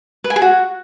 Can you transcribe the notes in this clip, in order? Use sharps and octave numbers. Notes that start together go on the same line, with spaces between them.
B4
G#5
G#4
F#4